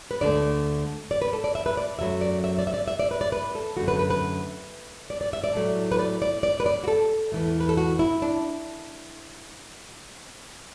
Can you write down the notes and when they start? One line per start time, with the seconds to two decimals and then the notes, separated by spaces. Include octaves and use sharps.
0.11 B4
0.21 D2 D3 A3 D5
1.11 D5
1.22 B4
1.33 A4
1.44 D5
1.55 E5
1.66 B4
1.77 D5
1.99 F#2 F#3 A3 E5
2.21 D5
2.44 E5
2.59 D5
2.67 E5
2.74 D5
2.88 E5
2.99 D5
3.11 B4
3.21 D5
3.32 B4
3.55 A4
3.77 F#2 D3 A3 F#4
3.88 B4
3.99 B4
4.10 B4
5.10 D5
5.21 D5
5.33 E5
5.44 D5
5.55 A2 F#3 A3
5.92 B4
5.99 D5
6.22 D5
6.43 D5
6.60 B4
6.66 D5
6.84 F#4
6.88 A4
7.32 E2 E3 A3
7.60 B4
7.69 A4
7.77 F#4
7.99 E4
8.22 D4